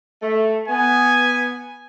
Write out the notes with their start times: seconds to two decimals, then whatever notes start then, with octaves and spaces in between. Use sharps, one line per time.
0.22 A3
0.68 B3 G#5